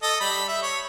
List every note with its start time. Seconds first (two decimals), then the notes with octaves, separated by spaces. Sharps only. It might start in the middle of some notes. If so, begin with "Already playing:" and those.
0.03 A4 D#5
0.20 G3 B5
0.48 E5
0.63 C#5